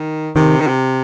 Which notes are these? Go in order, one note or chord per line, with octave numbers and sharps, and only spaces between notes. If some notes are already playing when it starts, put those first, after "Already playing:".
Already playing: D#3
C3 D#3
D#3
C3